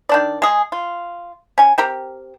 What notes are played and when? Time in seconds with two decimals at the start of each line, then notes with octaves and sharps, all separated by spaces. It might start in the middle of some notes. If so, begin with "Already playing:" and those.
0.09 D#3 D4 D5
0.42 G#3 G#4
0.72 F4
1.58 C#4 G#5
1.78 C4 G4 A#4